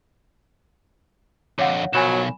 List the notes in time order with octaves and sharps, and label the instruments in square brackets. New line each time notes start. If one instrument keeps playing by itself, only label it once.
[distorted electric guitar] F2 D3 [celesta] C#5 F5 F#5
[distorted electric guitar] B1 [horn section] D#3 F3 F#3 [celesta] G#5 B5 E7